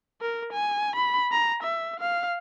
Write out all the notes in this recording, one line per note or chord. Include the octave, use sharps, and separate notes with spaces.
A#4
G#5
B5
A#5
E5
F5